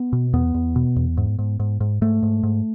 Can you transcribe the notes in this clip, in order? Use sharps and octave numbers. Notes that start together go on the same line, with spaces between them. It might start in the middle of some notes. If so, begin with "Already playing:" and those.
Already playing: B3
B2
E2 B3
E2
B2
E2
G#2
G#2
G#2
G#2
G#2 A3
G#2
G#2